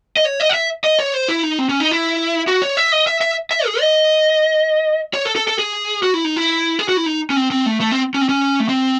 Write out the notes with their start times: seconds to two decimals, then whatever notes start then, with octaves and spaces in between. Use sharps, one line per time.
0.17 D#5
0.25 C#5
0.40 D#5
0.50 F#5
0.54 E5
0.84 D#5
0.99 C#5
1.14 C5
1.28 E4
1.43 D#4
1.59 C4
1.69 C#4
1.80 D#4
1.91 E4
2.47 F#4
2.62 C#5
2.77 E5
2.92 D#5
3.07 E5
3.21 E5
3.51 E5
3.66 G#4
3.80 D#5
5.14 C#5
5.25 A4
5.36 A4
5.48 A4
5.59 G#4
6.03 F#4
6.14 E4
6.25 D#4
6.36 E4
6.79 G#4
6.89 F#4
6.97 E4
7.06 D#4
7.30 C#4
7.36 C4
7.51 C4
7.66 A3
7.80 A3
7.92 C4
8.14 C#4
8.21 C4
8.29 C#4
8.60 A3
8.69 C4